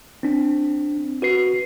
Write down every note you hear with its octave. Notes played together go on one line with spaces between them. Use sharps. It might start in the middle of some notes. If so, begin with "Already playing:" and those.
C4 D4
F#4 B4 C7